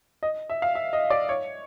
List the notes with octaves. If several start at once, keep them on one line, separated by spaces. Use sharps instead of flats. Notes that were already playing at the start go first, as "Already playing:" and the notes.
D#5
E5
F5
E5
D#5
D5
C#5